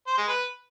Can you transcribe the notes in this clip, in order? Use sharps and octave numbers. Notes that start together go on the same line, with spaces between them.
C5
G#3
B4